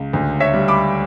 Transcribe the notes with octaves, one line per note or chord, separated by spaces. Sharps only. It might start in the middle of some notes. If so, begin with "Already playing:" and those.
Already playing: C#2
D2
C#5 E5
G3
B5 D6